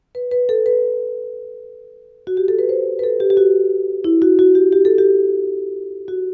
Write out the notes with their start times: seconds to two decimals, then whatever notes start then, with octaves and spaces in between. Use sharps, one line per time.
0.15 B4
0.31 B4
0.49 A4
0.66 B4
2.27 F#4
2.37 G4
2.48 A4
2.59 B4
2.69 C5
2.99 B4
3.04 A4
3.20 G4
3.30 G4
3.37 F#4
4.04 E4
4.22 F#4
4.39 F#4
4.55 G4
4.73 G4
4.85 A4
4.98 G4
6.08 F#4